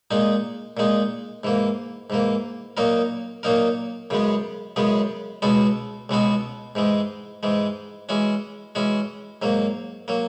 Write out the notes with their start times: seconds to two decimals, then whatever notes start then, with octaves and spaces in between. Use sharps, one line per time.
0.11 A#2 G#3 D#4
0.77 A#2 G#3 D#4
1.44 G#2 E3 A#3
2.10 G#2 E3 A#3
2.77 A#2 F#3 A#3 D#4 A#4
3.43 A#2 F#3 A#3 D#4 A#4
4.10 F#2 C#3 G#3 B3
4.76 F#2 C#3 G#3 B3
5.42 C#2 B2 G#3 B3 F#4
6.09 C#2 B2 G#3 B3 F#4
6.75 G#2 E3 G#3
7.43 G#2 E3 G#3
8.09 E3 G#3 C#4 F#4
8.75 E3 G#3 C#4 F#4
9.42 G#2 F#3 A#3
10.08 F#3 A#3